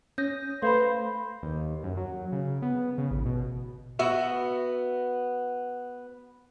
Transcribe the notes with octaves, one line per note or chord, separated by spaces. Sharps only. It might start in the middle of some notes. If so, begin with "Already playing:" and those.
C#4 D#6 G6 A#6
A3 B4 C5 F5 B5
D#2
F#2
F#3
C#3
B3
C#3
A1
B2
B3 F#4 E5